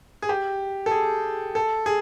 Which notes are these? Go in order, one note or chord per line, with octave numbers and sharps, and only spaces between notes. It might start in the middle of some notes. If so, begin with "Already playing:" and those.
G#4
G4
A4
G#4
A4
G#4